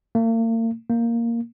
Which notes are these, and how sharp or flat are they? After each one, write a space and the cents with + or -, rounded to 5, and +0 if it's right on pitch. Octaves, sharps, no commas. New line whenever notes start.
A#3 -45
A#3 -5